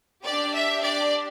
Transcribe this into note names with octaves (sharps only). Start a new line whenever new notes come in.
D4 G4 D5
E5
D5